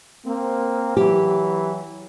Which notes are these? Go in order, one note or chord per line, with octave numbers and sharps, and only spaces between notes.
A#3 C4
E3 F#3 G4